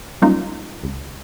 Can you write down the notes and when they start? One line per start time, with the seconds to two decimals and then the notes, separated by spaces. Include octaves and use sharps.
0.22 F#3 G3 A#3 C#4 D#4 F4
0.84 C#2